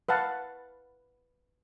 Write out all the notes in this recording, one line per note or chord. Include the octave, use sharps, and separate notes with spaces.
B4 F5 F#5 A5